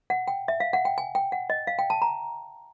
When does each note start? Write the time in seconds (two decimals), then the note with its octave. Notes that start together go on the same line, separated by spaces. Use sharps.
0.10 F#5
0.28 G5
0.48 E5
0.60 F5
0.73 F#5
0.85 G5
0.98 G#5
1.15 G5
1.32 F#5
1.50 D#5
1.67 F5
1.79 G5
1.90 A5
2.02 A#5